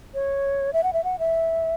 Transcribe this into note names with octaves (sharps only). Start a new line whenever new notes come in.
C#5
E5
F#5
E5
F#5
E5